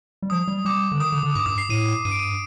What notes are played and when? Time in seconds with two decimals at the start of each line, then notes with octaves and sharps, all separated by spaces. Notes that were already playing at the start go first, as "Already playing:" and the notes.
0.22 G3
0.30 F3 D#6
0.48 G3
0.65 G3 D6
0.92 D3
1.00 D#3 D#6
1.12 D3
1.23 D3
1.35 G2 D6
1.46 G2 D#6
1.58 C7
1.69 A2 D#7
2.05 G2 D#7
2.11 D7
2.19 D#7